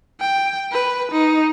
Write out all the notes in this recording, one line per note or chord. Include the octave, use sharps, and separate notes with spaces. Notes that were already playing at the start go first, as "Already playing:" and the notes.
G5
B4
D#4